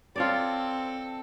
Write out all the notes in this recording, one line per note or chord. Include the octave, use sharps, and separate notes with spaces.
C4 F4 A4 C#5 D5